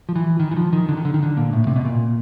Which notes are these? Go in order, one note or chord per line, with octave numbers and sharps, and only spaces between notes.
F3
E3
D#3
E3
F3
D#3
D3
D#3
D3
D#3
D3
A#2
A2
C3
B2
A#2